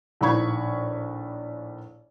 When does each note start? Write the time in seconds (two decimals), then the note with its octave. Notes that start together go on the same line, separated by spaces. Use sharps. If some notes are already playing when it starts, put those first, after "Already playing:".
0.21 A#1 A2 D#3 B5 C#6 G#6